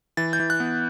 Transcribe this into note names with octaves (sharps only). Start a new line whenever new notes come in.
E3 A6
G6
E3
F#6
B3